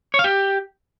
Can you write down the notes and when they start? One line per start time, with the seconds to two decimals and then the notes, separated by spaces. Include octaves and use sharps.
0.14 C#5
0.19 F5
0.24 G4